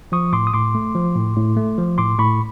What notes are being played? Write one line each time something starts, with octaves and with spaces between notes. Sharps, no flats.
F3 C#6 D#6
A2 C6 D6
D#6
A2 C6 D6
A3
F3
A2
A2
A3
F3
A2 C6 D6
A2 B5 C#6